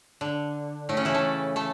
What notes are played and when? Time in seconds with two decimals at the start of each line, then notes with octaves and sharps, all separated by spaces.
0.21 D3
0.89 A2 A3
0.97 C#3 C#4
1.05 E3 E4
1.14 A3 A4
1.56 A3 A4